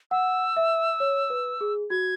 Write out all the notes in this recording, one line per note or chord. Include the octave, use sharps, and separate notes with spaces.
F#5 E6
E5
C#5
B4
G#4
F#4 G#6